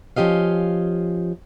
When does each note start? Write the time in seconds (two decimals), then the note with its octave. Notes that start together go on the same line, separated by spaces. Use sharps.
0.16 F3 C#4 G4 D#5 F5